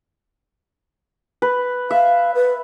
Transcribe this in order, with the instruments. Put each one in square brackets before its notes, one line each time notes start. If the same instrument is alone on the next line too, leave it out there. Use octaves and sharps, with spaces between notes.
[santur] B4
[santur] E5 [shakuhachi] F5
[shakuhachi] B4